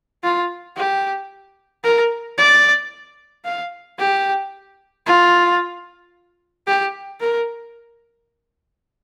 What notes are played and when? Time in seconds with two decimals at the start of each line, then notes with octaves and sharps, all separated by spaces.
0.24 F4
0.76 G4
1.84 A#4
2.38 D5
3.45 F5
3.99 G4
5.06 F4
6.67 G4
7.20 A#4